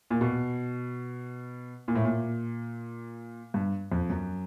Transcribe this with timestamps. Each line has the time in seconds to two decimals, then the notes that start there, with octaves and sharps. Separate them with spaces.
0.11 A#2
0.21 B2
1.88 A#2
1.95 A2
2.05 A#2
3.54 G2
3.92 F2
4.10 F#2